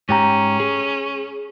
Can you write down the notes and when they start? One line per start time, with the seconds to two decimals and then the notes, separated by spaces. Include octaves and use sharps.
0.09 G#2 C#4 G4 A#5
0.60 G#4